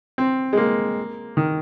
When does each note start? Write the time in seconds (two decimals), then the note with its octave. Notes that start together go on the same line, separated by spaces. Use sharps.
0.18 C4
0.53 G#3
0.57 A#3
1.37 D#3